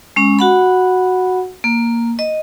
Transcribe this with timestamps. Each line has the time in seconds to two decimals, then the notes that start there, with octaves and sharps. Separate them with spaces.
0.16 G#3 C#4
0.39 F#4 F#5 B5
1.64 A#3
2.19 D#5